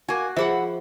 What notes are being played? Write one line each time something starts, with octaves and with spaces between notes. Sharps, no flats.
A#3 F#4 G#5
F3 G#4 E5 F#5 B5 E6